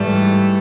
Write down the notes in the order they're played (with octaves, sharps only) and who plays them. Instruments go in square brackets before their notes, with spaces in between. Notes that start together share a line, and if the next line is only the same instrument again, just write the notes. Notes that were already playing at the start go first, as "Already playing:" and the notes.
Already playing: [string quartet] G#2 E3 A3 [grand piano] G3